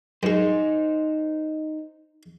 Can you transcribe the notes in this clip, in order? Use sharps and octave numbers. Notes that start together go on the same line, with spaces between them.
F#2 G#3 D#4 C5